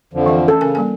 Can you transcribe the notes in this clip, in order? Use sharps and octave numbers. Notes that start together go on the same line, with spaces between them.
F2 D3 F3
E3 E5
C#4 A4
C#3 C#4 A#4 G#5
G3 A#3 G#5